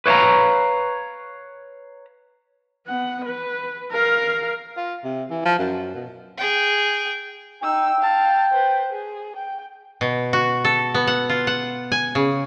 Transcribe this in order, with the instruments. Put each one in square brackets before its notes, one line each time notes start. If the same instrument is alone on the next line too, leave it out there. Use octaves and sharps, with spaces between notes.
[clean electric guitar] B4 C#5 E5 F5 A#5
[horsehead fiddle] B3 F#5
B4
A#4 F5
[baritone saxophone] F4
C3
E3
F3
F#2
B2
[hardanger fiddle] G#4 G5
[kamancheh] D#4 E6 [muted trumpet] G5
[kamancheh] F5 A5
B4 C5
G#4
G5
[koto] B2
F#4
A4
B3
F#5
F4
F#5
G#5
C#3